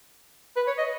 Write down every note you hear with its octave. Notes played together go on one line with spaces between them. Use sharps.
B4
C#5
D#5